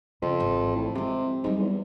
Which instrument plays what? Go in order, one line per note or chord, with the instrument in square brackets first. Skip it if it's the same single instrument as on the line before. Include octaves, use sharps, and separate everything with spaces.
[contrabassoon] F2 [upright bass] C#3
[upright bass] G#1 E3
[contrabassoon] A2
[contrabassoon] C3 [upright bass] F3 G#3
[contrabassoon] G#2 [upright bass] F#3 G3
[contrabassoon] E2